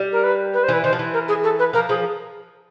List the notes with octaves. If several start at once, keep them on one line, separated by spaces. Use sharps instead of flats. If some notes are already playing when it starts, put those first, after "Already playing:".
Already playing: G3
A#4
B4
B4
C5
E3 B4
D#3 C5
F3
E3
A#4
G#4
A4
B4
F3 A#4
F3 G#4